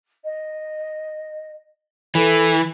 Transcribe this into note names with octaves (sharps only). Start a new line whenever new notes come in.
D#5
E3 A4